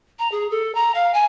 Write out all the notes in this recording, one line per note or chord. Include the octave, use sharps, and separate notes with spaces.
A#5
G#4
A4
A#5
F5
G#5